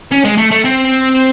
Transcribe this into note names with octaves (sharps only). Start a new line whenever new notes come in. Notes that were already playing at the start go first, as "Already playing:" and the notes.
C#4
G#3
A3
A3
C4